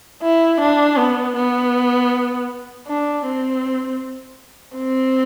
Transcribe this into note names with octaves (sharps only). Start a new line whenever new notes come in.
E4
D4
B3
B3
D4
C4
C4